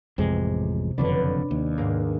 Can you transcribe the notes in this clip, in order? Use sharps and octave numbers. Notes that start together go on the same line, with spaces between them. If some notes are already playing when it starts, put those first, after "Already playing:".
A1 F2 C3 G#3
F#1 F2 D3 C#4 D4 B4
D#2
G#2 G#3 A#3